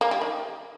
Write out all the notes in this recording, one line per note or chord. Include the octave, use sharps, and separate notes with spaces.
A#3
G3
D#3